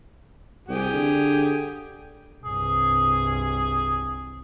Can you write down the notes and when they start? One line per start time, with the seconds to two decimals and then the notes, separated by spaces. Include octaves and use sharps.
0.68 C2 G4 G#4
0.93 D3
2.44 C2 G2 G#4